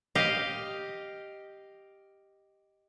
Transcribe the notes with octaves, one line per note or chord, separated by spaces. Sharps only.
G4 D#5 F5